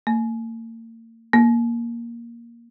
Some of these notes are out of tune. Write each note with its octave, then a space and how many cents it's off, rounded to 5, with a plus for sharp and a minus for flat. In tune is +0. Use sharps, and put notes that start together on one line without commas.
A#3 -40
A#3 +10